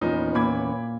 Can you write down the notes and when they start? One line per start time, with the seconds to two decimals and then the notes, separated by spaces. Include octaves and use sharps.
0.02 E2 A#2 F3 B3 C#4 D#4
0.35 A#2 B5 D6 G#6